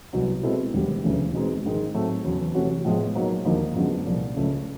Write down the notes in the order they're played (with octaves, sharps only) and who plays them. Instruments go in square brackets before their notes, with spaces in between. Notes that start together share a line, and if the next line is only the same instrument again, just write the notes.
[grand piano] C2 B2 F#3
B2 G#3 C4 E4 A4
E1 D#2 D3 G3 B3
E1 D2 C#3 E3 A3
B2 G#3 C4 D#4
G#1 G#2 D#3 G#3
A2 F#3 A3 C4
E2 C#3 F#3
C3 E3 A3 C#4 F#4
A2 F3 G#3 B3
B2 F#3 A#3 D#4
D#2 D3 F3 A#3 D#4
F#2 D3 F3 G#3 B3
C2 A#2 F3
C#2 C#3 F3 A3